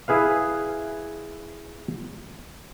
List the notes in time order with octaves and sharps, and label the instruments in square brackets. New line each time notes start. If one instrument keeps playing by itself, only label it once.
[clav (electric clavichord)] E4 G#4 B4 F5